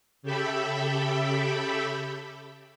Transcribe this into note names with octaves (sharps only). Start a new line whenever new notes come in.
C#3 G4 A4 E5 G5 B5